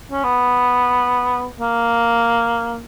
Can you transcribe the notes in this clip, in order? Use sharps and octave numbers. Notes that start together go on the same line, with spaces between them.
C#4
B3
A#3